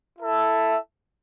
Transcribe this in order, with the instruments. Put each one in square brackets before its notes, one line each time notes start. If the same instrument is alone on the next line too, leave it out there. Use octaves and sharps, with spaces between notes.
[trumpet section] E4 A4 E5